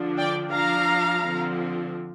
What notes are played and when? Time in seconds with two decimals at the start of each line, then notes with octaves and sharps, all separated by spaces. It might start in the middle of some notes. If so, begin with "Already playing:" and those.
Already playing: D3 F3 D4
0.18 D5 G5
0.53 F3 D4 F5 A#5
1.24 D3 F3 C4